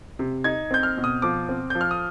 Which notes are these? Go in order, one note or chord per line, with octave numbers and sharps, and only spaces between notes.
C3
D#4 G#6
C4 G6
F6
B2
D#6
F3 D6
C4
F3 G6
F6
D#6